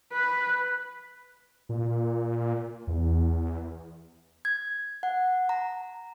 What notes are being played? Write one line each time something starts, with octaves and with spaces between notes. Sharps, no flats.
B4
A#2
E2
G#6
F#5
A#5